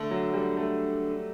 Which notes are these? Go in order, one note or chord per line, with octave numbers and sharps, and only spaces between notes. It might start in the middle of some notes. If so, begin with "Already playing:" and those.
Already playing: D3 A3
F#3
G3
A3